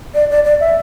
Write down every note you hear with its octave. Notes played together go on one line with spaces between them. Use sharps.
D5
D5
D5
E5